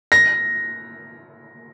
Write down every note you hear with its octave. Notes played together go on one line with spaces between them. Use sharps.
A#6